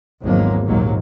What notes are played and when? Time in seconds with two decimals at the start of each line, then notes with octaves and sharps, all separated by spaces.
0.23 G#1 E2 F3 F#3 G#3 A#3
0.66 A#1 D#2 G#2 F#3 A#3